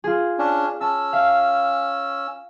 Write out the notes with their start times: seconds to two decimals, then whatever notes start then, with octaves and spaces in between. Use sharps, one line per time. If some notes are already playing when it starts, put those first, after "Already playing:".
0.04 F4 G#4
0.39 C#4 D4
0.81 C#4 A5 E6
1.13 E5 F5